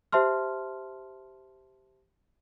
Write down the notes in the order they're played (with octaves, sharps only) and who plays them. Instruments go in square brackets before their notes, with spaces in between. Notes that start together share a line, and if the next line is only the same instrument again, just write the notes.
[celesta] G4 C5 E5 A5 C6 F6